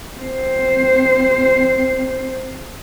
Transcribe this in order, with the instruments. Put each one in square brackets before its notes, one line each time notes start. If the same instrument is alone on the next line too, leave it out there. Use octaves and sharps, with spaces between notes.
[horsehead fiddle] C4 C5